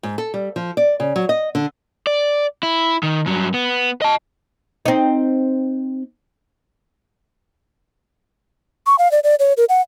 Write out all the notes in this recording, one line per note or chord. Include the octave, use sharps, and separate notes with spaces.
G#2
A4
G3
F3
D5
C#3
F#3
D#5
D3
D5
E4
D#3
G2 F#3
B3
D#5 A5
C4 D#4
C#6
F5
D5
D5
C#5
A#4
F#5